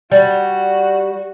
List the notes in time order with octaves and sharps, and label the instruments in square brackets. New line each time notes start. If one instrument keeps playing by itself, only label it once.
[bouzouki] G3 [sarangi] F#4